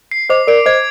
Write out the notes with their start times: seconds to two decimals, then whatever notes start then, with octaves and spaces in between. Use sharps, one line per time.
0.11 C7
0.30 C5 D#5 D6
0.47 A#4 D5 D7
0.66 C5 D#5 G#6